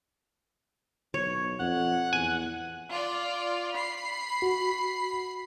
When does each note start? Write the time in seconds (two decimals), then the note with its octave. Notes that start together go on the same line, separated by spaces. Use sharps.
1.14 B1 C#5
1.60 F2 F#5
2.13 E2 G#5
2.92 F4 D5
3.75 B5 C7
4.42 F#4